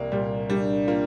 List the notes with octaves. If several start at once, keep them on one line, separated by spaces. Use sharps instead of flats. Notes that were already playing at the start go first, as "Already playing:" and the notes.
Already playing: C2 A#3
A#2 G3
G3 D4
A#3 F4